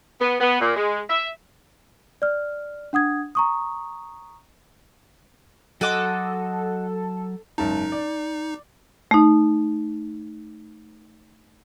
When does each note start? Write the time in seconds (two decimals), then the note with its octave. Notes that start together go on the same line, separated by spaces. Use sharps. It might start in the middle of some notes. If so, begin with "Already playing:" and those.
0.21 B3
0.40 B3
0.61 A#2
0.76 G#3
1.10 E5
2.22 D5 F6
2.93 D4 F#5 D#6 G#6
3.35 A#5 C#6 D#6
5.81 F#3 F#4 A4 D#5 C6 D6
7.58 F#1 G#2 D#4 A5
7.92 D5
9.11 A3 D#4